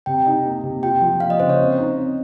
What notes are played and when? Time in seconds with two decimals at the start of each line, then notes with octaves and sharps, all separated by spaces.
0.06 C3 G5
0.26 D#4
0.45 A#3
0.63 C3
0.83 F4 G5
1.02 F3
1.20 A#3 F5
1.30 D#5
1.40 C#3 C5
1.49 C#5
1.59 C4
1.78 D#4
1.97 C4